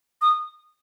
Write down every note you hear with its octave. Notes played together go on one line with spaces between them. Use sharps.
D#6